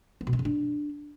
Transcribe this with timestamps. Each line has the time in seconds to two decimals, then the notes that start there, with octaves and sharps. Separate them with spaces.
0.21 B3
0.27 B2
0.33 C4
0.39 C#3
0.45 D4